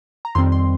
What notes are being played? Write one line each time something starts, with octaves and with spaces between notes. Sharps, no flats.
A#5
F2 D#3 G3 C4 C6
C6